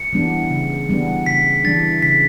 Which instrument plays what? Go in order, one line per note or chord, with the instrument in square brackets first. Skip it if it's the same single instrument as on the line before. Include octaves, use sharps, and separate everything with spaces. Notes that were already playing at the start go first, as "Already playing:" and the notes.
Already playing: [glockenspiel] C#7
[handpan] E3 G3 B3 D4
C#3
E3 G3 B3 D4
[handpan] C#3 [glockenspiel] B6
[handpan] E3 G3 D4 [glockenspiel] A6
[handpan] C#3 [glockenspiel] B6